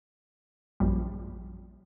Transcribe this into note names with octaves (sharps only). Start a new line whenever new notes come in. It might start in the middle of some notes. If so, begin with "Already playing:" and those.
A#1 F#2 G3